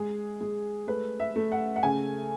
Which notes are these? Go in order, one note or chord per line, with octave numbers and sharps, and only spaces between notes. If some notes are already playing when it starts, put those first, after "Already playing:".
Already playing: G#3 G#4
G#3
A3 B4
E5
A3
F#5
F#5
C#3 G#5